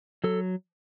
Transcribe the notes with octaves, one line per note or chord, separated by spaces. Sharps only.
F#3 A4